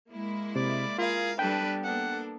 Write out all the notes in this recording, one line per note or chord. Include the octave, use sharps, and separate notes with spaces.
G#3 A#3 E4
C3 D5
F4 G#4 A#4 F5
G3 B3 D4 A4 B4 G5
A#3 D4 A4 F#5